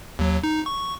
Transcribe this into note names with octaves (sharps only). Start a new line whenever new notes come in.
D#2 F#3
D#4
C#6